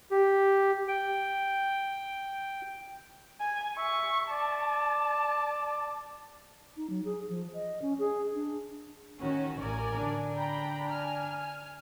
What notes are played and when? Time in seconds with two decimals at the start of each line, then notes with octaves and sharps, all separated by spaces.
0.11 G4
0.88 G5
3.40 G#5
3.77 E5 C#6
4.31 D5 A5
6.77 D#4
6.90 F#3
7.05 G#4
7.29 F3
7.54 D#5
7.82 C#4
7.99 G#4
8.34 D4
9.21 D#3 C#4 F#4
9.60 A1 A#4 D5 G#5
9.94 D3 D4
10.35 G5 A#5 B5
10.92 G#5 F6